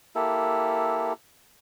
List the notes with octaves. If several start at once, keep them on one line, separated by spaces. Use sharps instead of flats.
A#3 E4 G4 A4